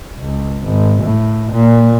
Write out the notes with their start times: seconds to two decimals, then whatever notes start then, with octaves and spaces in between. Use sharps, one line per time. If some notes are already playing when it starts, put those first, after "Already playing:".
0.18 C#2
0.64 G#1
1.03 A2
1.52 A#2